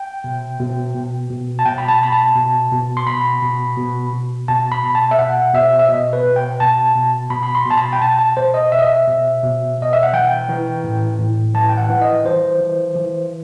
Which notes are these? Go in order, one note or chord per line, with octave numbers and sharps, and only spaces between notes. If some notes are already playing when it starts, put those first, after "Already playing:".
Already playing: G5
B2
B2
B2
B2
A5
B2 G5
B5
A5
B2 B5
A5
B2
B2
C6
B2 B5
B2
B2
B2
B2 A5
B5
B2
A5
E5
B2 F#5
B2 E5
E5
B2 D#5
B4
B2
G5
B2 A5
B2
B2 B5
B5
C6
B2 A5
B5
G5
B2 A5
A5
B2 C5
D#5
B2 E5
D#5
E5
B2
B2
B2 D#5
E5
F#5
E3 G5
E3
A2
A2
E3 A5
G5
F#5
E3
D#5
E3 C5
E3
E3